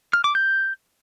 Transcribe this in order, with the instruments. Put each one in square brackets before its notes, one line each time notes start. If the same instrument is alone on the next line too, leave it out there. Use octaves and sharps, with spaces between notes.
[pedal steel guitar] F6
D6
G6